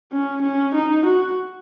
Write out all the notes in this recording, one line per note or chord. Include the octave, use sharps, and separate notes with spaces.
C#4
C#4
D#4
F#4